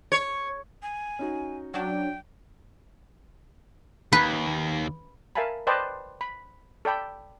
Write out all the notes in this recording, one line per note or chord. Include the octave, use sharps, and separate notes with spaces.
C#5
G#5
C#4 D#4 F#4
F#3 D4 G5
D#2 B4
A#4 E5 F5 G#5 A5 B5
B4 C5 D5 D#5 G5 A5
B5
A4 D5 G5 B5